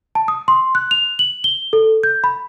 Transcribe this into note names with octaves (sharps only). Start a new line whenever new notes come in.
A5
D#6
C6
F#6
F7
F#7
G7
A4
G6
B5